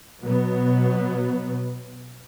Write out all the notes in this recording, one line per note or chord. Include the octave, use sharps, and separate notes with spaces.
B2 F#3 B3